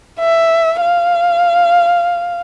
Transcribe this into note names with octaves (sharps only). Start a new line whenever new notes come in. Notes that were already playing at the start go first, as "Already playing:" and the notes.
E5
F5